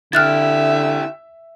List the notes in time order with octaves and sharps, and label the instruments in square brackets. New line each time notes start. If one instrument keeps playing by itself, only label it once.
[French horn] D3 [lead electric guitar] E4 G4 [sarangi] E5 [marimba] F6 F#6 A6